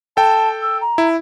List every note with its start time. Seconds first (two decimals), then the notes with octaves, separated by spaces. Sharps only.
0.17 A4 G5 A5
0.62 E6
0.81 A#5
0.98 E4